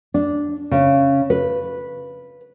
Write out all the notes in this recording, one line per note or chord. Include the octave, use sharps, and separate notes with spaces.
D4
C#3
B4